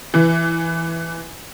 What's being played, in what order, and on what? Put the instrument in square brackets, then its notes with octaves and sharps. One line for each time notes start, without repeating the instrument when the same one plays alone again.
[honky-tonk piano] E3